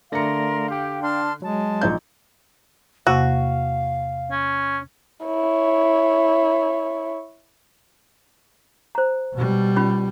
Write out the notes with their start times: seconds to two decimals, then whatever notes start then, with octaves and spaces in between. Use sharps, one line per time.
0.12 D3 A3 A#4 D5 F5 C6 A#6 C#7
0.68 G4 F5 G5
1.02 D4 A5 C6 F6
1.42 F#3 G#3 A5
1.81 A#1 D#4 G6
3.07 E2 C3 A#3 F#4 F5
4.31 C#4
5.26 E4 C#5
8.95 C5 A#5
9.33 B2 G3
9.76 C#4 F4 B5